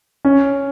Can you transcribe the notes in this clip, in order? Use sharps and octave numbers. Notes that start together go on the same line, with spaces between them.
C#4